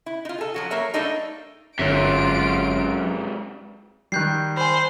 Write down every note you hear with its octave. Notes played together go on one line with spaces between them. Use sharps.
E4
D#4 F4
G#4 A4
F3 F#3 F#4
A#3 A#4 C#5 E5
G3 A3 A#3 D4 D#4 A4
G1 F#2 C3 G#3 F4 C#5 D7
D#3 G3 F#6 G6 C7
C5 G#5 B5